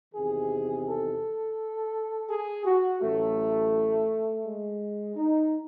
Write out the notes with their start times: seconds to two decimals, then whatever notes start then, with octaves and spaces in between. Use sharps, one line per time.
0.14 E2 C3 D#3 G#4
0.86 A4
2.29 G#4
2.66 F#4
3.01 A1 A2 F#3 A3
4.45 G#3
5.16 D#4